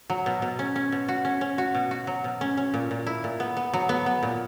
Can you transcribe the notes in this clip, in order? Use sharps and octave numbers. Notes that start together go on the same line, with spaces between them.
F#3
B2
B2
C#4
C#4
B2
F#4
C#4
C#4
F#4
B2
F#4
F#3
B2
C#4
C#4
A#2
A#2
E4
A#2
B3
B3
F#3
B3
B3
A#2